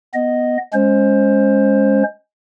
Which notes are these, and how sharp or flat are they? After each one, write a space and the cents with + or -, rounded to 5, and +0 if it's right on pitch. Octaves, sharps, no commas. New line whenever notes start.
B3 +0 D#5 +0
G#3 +0 C#4 +0 C5 +15